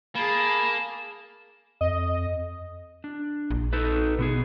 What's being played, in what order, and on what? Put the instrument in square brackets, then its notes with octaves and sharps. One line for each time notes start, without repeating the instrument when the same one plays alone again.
[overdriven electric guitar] A#3 [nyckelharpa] G#4 A5 [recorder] B5 [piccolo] E7
[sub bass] F2 [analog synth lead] D#5
[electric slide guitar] D4
[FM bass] A#1
[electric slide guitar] D#4 A4 B4
B2 B3 G#4